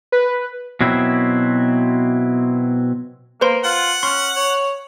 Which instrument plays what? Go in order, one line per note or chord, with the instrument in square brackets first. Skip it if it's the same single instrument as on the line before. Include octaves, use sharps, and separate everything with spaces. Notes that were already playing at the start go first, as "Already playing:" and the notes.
[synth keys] B4
[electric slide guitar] B2 F#3 C4 E4
[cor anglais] A#3 [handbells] B4 C5 C6
[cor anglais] F4 [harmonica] F#5
[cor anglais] C#4 [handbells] C6 F6
[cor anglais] C#5